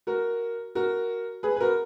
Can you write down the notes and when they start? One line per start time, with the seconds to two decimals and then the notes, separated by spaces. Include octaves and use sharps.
0.07 F#4 A#4
0.75 F#4 A#4
1.43 G#4 B4
1.56 B4
1.60 F#4 A#4